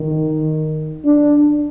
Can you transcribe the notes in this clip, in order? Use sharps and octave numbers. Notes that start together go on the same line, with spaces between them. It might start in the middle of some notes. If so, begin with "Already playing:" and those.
Already playing: D#3
D4